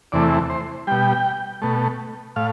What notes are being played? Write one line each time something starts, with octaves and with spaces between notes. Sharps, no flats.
E2 C3 E3 A3 D5
C5
B2 G3 G5
B2 A3
A2 F5